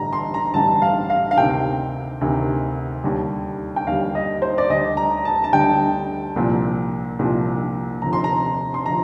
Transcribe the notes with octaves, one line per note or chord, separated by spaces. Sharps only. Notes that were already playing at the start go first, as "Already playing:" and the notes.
Already playing: A1 G2 D3 G3 A#5
C6
A#5
A1 G2 D3 G3 A5
F5
F5
F5
D2 C3 D#3 G5
D2 C3 D#3
D#2 D3 G3
G5
D#2 D3 G3 F5
D#5
C5
D5
D2 D3 G3 D#5
A#5
A5
A5
D2 D3 G3 G5
C2 A#2 F3
C2 A#2 F3
F1 D#2 D3 F3 A#5
C6
A#5
C6
D3 F3 A#5